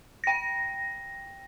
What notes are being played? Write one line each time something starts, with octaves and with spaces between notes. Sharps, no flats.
G5 A#6